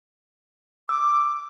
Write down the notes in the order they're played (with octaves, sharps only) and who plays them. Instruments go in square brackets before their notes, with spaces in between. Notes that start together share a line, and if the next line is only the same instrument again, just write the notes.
[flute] D6 [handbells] E6